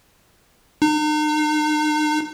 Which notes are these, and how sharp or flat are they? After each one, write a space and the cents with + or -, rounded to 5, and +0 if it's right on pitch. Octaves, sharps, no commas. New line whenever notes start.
D#4 -40